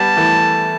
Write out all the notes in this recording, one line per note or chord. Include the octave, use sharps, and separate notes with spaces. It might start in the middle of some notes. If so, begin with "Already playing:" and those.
Already playing: G3 B3 A5
E3 A3